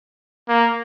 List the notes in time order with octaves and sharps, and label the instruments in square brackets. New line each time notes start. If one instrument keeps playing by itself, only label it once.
[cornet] A#3